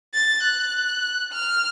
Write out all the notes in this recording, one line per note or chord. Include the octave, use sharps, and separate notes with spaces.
A6
F#6
F6